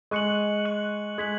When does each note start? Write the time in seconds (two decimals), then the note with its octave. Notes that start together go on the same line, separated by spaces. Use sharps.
0.11 G#3 C#6 F#6 C#7 F#7
0.65 C#6 F#6 C#7 F#7
1.18 G#3 G#6 B6 F#7